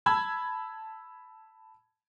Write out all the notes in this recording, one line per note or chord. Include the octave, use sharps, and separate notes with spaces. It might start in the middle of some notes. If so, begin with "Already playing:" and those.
A5 B5 E6 G#6